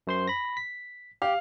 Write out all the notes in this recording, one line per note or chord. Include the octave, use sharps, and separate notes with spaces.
F#2 C5 C6
B5 A#6
B6
G4 F5